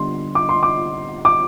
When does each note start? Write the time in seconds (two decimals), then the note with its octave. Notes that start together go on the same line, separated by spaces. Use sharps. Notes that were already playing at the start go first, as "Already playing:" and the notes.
Already playing: D3 G3 B3 C6
0.35 D6
0.49 C6
0.63 D6
1.25 D6